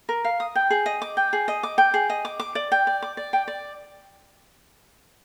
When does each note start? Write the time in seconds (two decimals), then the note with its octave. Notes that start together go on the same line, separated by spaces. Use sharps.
0.09 A#4
0.24 F5
0.40 D#6
0.55 G5
0.70 G#4
0.86 D#5
1.02 D6
1.17 G5
1.33 G#4
1.48 D#5
1.63 D6
1.78 G5
1.94 G#4
2.10 D#5
2.25 D6
2.40 D6
2.55 D5
2.72 G5
2.87 D5
3.02 D6
3.17 D5
3.33 G5
3.48 D5